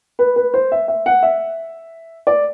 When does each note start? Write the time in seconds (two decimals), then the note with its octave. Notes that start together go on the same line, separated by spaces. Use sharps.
0.19 B4
0.36 B4
0.54 C5
0.72 E5
0.88 E5
1.06 F#5
1.23 E5
2.27 D5